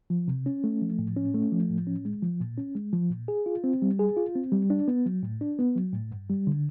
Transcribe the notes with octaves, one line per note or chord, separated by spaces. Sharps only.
F3
C3
C#4
A3
F3
A2
C#4
A3
F3
A2
C#4
G#3
F3
A#2
C#4
G#3
F3
A#2
G#4
F4
C4
G3
G#4
F4
C4
G3
D4
B3
F#3
A2
D4
B3
F#3
A2
G2
G3
D3